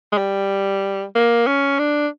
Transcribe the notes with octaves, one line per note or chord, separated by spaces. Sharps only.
G#3
G3
A#3
C#4
D4